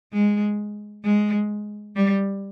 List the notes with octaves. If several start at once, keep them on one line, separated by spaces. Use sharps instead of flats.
G#3
G#3
G3